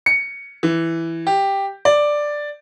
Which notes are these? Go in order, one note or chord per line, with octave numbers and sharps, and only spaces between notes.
C#7
E3
G4
D5